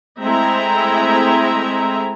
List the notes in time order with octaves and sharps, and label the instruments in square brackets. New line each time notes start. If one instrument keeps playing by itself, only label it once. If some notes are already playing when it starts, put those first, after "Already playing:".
[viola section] G#3 A3 C4 E4 E5 A#5